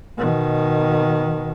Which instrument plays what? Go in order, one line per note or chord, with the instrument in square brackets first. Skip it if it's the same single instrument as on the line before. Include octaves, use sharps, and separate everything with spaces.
[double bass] B2 D#3